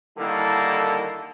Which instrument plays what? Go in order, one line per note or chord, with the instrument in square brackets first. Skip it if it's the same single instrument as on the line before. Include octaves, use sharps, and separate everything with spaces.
[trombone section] D3 D#3 G3 A#3 E4 A4